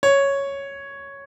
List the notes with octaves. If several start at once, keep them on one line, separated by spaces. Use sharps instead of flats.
C#5